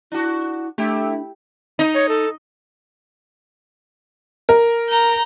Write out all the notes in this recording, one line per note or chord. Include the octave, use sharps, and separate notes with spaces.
D4 E4 F#4
A3 D4 E4 G4
D#4
C#5
A4
A#4
A#5 G6